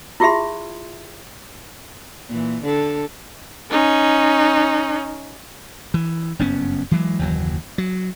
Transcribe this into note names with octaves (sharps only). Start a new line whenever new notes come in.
E4 F4 G4 G#4 E5 C6
A#2 E3
D3 A4
C#4 D#4
E3
F#1 G2 B3 C#4
E3 F#3 G#3
F#1 D#2 E3 F#3
F#3